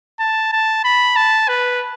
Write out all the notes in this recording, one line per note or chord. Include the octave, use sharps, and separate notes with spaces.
A5
A5
B5
A5
B4